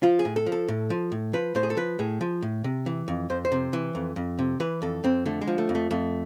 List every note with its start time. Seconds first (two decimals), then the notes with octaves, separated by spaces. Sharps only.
0.03 F3 F4
0.19 G#4
0.25 A2
0.36 A4
0.46 F3
0.52 A4
0.68 A2
0.90 F3
1.12 A2
1.33 F3 B4
1.55 A2 C5
1.63 G#4
1.70 A4
1.77 F3 B4
1.99 A2 G#4
2.21 F3
2.42 A2
2.64 C3
2.86 E3
3.08 F2
3.30 F2 C5
3.45 C5
3.52 C3
3.73 E3
3.95 F2
4.16 F2
4.39 C3
4.60 E3 B4
4.82 F2 A4
5.04 F2 C4
5.26 D3 A3
5.41 G#3
5.47 F3
5.58 A3
5.69 F2
5.75 A3
5.91 F2 A3